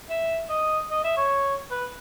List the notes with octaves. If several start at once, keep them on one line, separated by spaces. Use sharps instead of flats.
E5
D#5
D#5
E5
C#5
B4